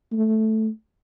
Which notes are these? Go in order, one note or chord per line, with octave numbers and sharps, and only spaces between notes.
A3